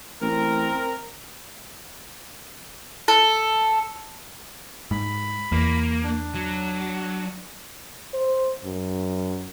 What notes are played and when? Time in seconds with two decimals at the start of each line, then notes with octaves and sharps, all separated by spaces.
0.21 A1 C4 A#4
3.08 A4
4.91 G#2 B5
5.52 E2 A#3
6.03 D4
6.35 F#3
8.13 C5
8.64 F#2